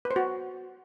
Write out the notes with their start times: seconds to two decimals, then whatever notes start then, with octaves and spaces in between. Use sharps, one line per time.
0.05 B4
0.11 C5
0.16 F#4